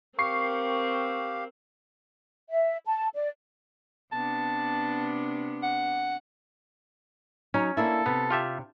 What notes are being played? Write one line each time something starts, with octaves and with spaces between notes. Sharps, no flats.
C4 G4 A#4 F5 C#6 C7
E5
A5
D5
C3 B3 D4 A5
F#5
F#3 C#4 D#4 C#5
A#3 D4 E4 A4
C3 B3
F4 G4 E5